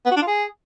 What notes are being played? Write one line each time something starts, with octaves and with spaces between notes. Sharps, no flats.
B3
F#4
D4
F4
G#4